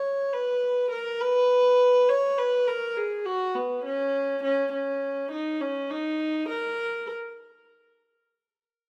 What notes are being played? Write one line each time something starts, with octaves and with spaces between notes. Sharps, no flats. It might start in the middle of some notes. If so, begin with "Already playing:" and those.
Already playing: C#5
B4
A#4
B4
C#5
B4
A#4
G#4
F#4
B3
C#4
C#4
C#4
D#4
C#4
D#4
A#4